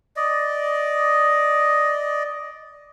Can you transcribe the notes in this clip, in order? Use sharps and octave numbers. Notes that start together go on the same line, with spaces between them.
D5 D#5